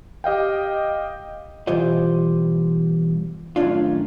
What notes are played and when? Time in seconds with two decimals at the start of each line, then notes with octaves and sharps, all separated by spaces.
0.24 G4 D#5 F5 G5
1.67 B2 E3 G3 F4 C5 D#5
3.56 F#2 A2 D#3 C#4 D4 F4